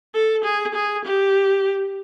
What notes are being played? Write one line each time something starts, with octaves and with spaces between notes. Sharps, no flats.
A4
G#4
G#4
G4